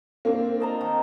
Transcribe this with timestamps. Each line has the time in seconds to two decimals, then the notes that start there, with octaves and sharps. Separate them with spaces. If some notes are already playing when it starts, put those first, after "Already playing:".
0.25 A#3 C4 D4
0.60 D#5 A5 A#5
0.81 D#3